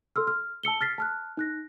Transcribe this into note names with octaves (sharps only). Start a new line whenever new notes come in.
A4 C6 E6 F6
F6
A5 E6 C#7 G7
F6 A6 B6 C7
A5 F6 F#6
D#4 F#6 A#6